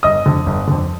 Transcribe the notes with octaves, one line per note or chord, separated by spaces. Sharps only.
G1 D#5 D#6
F2 D3
G1
F2 D3